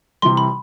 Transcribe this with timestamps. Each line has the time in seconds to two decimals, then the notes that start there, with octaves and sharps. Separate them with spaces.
0.22 C3 E3 G3 C6
0.37 B5